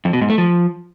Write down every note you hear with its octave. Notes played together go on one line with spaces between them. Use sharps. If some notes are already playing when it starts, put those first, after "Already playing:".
F2
B2
G#2
A3
F3